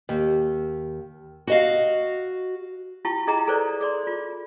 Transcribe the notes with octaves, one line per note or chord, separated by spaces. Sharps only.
D#2
F#4 D#5 F5
E4 F4 G4 G5 A5 C#6
E4 G#4 D#5 G5 A#5
G#4 A4 B4 C5 D5
G#4 D5 C6
F4